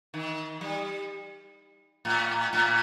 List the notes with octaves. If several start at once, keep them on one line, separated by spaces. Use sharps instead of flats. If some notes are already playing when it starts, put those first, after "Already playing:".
D#3
G3
A2
A2